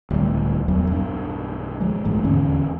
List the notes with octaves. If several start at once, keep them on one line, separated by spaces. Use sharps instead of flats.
D1 C#2 D#3 G3
E1 E2 F#3 G3
B1 G2 D4
F3 G#3
A#1 G#2 E3 A3
D#1 E2 D3 C#4